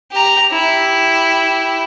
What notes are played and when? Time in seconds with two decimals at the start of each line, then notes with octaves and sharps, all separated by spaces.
0.12 G4 A#5
0.52 E4 G4